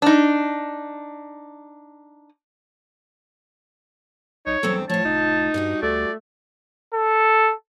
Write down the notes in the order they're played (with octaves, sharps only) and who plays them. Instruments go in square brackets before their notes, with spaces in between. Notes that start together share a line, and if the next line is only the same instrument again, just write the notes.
[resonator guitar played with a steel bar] D4 D#4
[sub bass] B1 [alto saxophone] D#4 [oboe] C#5
[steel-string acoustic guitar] E2 G2 C4 [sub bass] F#3 [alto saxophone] A4
[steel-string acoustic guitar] A2 F4 [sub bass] F3 [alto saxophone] C#5 [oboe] A5
[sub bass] F1 [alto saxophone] D#4
[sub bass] G2 [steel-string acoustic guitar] G3 D4 F#4
[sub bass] D2 [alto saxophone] A3 [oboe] D5
[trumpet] A4